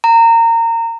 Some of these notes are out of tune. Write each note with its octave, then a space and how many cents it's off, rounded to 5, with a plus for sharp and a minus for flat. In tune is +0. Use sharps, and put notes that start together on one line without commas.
A#5 -25